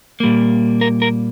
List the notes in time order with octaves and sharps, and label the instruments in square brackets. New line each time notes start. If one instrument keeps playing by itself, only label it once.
[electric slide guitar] A#2 G3 A#3
A#4
A#4